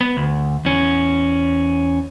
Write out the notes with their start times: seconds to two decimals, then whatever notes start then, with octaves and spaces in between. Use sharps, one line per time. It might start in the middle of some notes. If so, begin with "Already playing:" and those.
0.01 B3
0.17 D2
0.65 E2 C#4